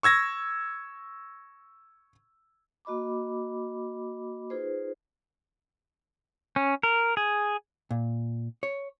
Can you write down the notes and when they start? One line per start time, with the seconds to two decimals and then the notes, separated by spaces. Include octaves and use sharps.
0.03 C#6 E6 G#6 A#6
2.85 A#3 F#4 D#5 B5 D6
4.50 D#4 F4 G#4 B4 C5
6.56 C#4
6.83 A#4
7.17 G#4
7.91 A#2
8.63 C#5